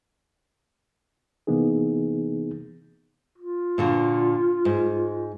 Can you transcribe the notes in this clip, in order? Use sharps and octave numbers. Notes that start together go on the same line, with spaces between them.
C3 E3 A#3 B3 D#4 G#4
F4
A#2 D3 F#4
G#2